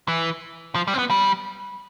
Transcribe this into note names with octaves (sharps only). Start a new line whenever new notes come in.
E3
F3
G3
C4
B3
G3